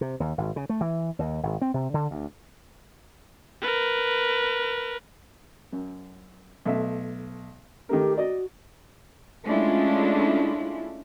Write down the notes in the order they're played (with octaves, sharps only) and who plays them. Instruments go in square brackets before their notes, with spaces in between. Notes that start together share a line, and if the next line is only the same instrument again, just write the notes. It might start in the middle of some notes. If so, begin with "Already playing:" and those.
[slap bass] C3
D#2
G#1
C#3
A3
E3
D#2
G#1
C4
C3
D3
D2
[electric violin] A#4 B4
[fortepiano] F#2
B1 A3 E5
[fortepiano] D#3 A3 A#4 [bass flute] G4
[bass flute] F#4 [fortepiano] D5 D#5
[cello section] G#3 A3 C#4 D4 E4 F4